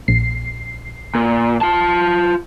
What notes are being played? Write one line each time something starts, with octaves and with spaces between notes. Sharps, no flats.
A#1 C7
A#2
F4 A5